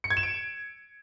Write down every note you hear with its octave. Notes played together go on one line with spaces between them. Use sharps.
C#7
G#6
E7
D7